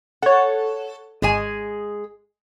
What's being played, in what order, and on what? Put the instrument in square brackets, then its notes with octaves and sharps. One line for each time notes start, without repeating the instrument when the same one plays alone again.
[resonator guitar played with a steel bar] A4 [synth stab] C#5 F#5
[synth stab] G#1 [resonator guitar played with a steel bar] G#3 G#4 G#5